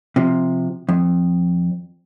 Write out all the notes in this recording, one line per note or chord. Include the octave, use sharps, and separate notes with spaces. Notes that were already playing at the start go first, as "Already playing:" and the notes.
C3 F3
F2